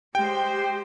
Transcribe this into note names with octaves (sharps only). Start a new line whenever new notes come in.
G#3 G4 C5 G5